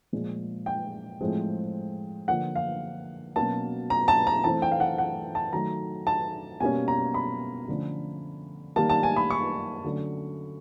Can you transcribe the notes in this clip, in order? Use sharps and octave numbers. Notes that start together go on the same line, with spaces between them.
A#2 F3 G#3
G5
A2 F3 G#3 C4
D3 F3 A#3 F#5
F5
B2 F#3 A#3 C#4 A5
A#5
A5
A#5
E3 A3 C4 A5
G5
F5
F#5
F#5
A5
D#3 F#3 A3 A#5
A5
B2 G3 A#3 C#4 G#5
A#5
B5
D3 F3 A3 C#4
D#3 G3 A#3 A5
A5
G#5
B5
C#6
D3 F#3 A3 C#4